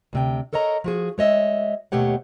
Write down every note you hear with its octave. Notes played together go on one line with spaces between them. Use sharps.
D2 C3 G5
A4 A#4 C#5 D#5 A#5
F3 F#4 G#4
G#3 C#5 D#5 E5
D#2 B2 A3 G4 C#5 F#5